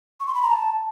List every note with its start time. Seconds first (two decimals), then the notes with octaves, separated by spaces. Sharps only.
0.20 C#6
0.27 C6
0.35 B5
0.43 A#5
0.50 A5